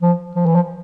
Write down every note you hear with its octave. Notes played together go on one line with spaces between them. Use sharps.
F3
F3
E3
F3